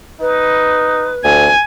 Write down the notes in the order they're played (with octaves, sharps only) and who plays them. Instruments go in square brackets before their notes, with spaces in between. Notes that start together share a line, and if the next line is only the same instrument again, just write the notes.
[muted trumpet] D#4 [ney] B4
[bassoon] D2 [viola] G#5